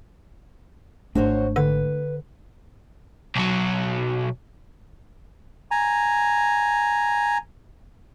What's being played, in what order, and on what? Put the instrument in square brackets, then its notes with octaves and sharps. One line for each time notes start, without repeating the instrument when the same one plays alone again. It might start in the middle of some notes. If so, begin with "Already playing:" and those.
[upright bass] G#1 G#3 [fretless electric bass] A3 D4 [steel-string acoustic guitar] F#4 C5 C#5
[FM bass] D3 [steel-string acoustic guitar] B4
[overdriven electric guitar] B1 F#3
[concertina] G#5 A#5